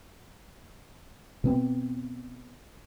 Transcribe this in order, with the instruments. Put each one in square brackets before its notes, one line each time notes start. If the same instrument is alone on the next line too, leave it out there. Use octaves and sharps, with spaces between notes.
[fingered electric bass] B2 B3 C4